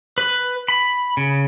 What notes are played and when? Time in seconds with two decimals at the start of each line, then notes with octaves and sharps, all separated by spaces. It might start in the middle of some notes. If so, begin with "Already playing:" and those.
0.18 B4
0.68 B5
1.17 C#3